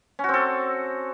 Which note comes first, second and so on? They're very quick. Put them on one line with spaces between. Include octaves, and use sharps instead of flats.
C#4 F#4 C4 A4